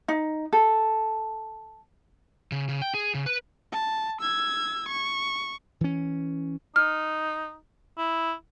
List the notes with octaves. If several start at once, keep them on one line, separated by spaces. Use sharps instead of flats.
D#4
A4
C#3
C#3
G5
G#4
C#3
B4
A5
E6 G#6
C#6
E3 C#4
D#4 F6
E4